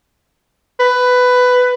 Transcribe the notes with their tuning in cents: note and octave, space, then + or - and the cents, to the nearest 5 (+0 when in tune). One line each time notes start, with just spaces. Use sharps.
B4 +10